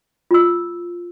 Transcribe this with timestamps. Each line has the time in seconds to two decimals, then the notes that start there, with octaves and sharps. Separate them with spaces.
0.31 F4 E6